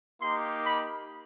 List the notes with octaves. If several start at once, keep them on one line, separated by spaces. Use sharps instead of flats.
A#3 D#4 G4 C6
B5